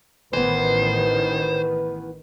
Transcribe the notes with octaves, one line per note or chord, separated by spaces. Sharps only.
A1 D#3 E3 B3 B4 C5